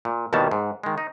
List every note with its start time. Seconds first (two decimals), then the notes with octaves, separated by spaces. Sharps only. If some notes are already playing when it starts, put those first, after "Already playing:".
0.05 A#2
0.33 D#2 B2 D#3 E3 G3 A5
0.51 G#2
0.83 D#3 G#3
0.98 D#4